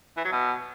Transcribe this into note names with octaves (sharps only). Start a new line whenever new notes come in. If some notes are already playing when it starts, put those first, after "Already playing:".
E3
F#3
B2